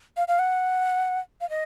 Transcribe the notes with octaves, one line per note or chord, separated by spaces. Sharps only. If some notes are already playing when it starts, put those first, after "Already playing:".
F5
F5
F#5
F5
D#5